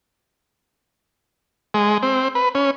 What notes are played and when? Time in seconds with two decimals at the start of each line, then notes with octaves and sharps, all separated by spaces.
1.74 G#3
2.03 C4
2.35 B4
2.55 C#4